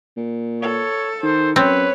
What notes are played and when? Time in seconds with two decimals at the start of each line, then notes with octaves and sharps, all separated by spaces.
0.17 A#2
0.62 A4 C#5
1.23 D#3 C5
1.56 F#2 C4 B4 C#5